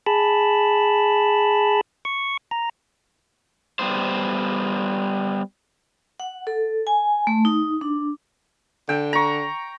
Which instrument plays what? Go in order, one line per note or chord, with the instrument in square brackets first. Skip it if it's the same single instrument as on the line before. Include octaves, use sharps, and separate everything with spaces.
[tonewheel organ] G#4 A5 B5
C#6
A#5
[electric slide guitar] G3 B3 C5
[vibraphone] F#5
A4
G#5
A3
D#4
D4
[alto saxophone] D3 [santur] G5
[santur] A#5 C#6